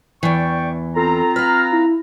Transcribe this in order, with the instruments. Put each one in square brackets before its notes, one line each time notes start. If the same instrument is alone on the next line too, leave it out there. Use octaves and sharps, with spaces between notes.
[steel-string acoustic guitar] E2 E3 [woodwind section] D5 G5 C#6
[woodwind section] C4 F4 A#5 [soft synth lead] A4
[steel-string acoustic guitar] B4 F5 [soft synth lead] F6
[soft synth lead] E4